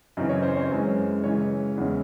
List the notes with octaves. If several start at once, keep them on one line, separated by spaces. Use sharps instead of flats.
F#2 C#3 E3 C4 D#5
C#5
C5
C#5
F#2 E3 G#3 C#4
C#3 E3 G#3 C#5
E2 C#3 G#3 C#4